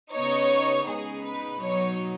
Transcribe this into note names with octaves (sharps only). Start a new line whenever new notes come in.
C#3 B3 D#4 C#5
C#3 G#3 B3 D#4 G#4
B4
B2 F#3 D#4 C#5